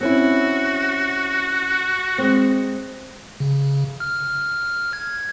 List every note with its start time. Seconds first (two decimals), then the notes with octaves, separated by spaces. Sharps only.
0.01 C4 C#4 E4 F#4
2.18 G#3 C4
3.40 C#3
4.00 F6
4.93 G#6